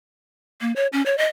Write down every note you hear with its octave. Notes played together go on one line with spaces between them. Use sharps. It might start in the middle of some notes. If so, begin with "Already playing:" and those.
A#3
C#5
C#4
C#5
D#5